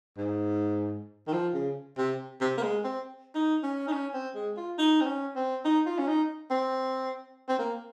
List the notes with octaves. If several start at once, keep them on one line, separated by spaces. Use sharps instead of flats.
G#2
D#3
F3
C#3
C3
C3
A#3
G#3
C4
D#4
C#4
D#4
C#4
C4
G#3
F4
D#4
C4
C#4
C4
D#4
F4
C#4
D#4
C4
C4
A#3